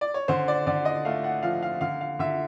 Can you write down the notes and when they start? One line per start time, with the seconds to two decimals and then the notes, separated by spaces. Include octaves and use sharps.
0.01 D5
0.14 C#5
0.28 D3 C5
0.48 D5
0.66 D3 D5
0.85 D#5
1.05 A3 F5
1.24 F#5
1.43 F3 F5
1.63 F5
1.81 D3 F5
2.01 F5
2.19 D3 E5